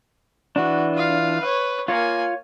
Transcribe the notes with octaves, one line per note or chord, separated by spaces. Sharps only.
E3 D4 F#4
F4 F5
B4 C#5
A#3 F4 C#5 G#5